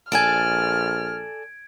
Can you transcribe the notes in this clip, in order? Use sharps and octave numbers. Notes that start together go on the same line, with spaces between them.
A#1 A4 D5 G#5 F6 G#6 D7